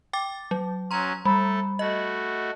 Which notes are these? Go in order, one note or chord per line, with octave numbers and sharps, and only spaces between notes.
G5 D6 A6
F#3
F#3 C#4 A#5 C6
G3 A3 A4 B5
A3 F#4 D#5